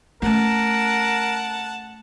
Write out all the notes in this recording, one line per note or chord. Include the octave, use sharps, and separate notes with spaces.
A3 C#4 A#4 F#5 A5